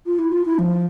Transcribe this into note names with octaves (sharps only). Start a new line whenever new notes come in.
F4
E4
F4
E4
F3